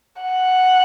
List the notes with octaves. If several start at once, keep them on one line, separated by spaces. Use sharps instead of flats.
F#5